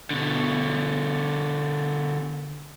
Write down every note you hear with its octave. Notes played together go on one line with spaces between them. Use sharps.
B2 D3